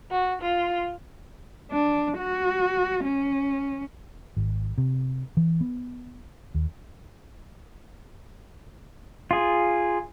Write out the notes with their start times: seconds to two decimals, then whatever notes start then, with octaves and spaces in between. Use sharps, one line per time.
0.11 F#4
0.42 F4
1.71 D4
2.18 F#4
3.05 C#4
4.37 G#1
4.78 C3
5.37 E3
5.61 B3
6.54 D#2
9.31 F4 G#4